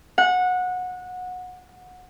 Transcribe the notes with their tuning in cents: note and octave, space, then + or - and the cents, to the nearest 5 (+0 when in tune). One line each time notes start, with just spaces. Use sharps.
F#5 -20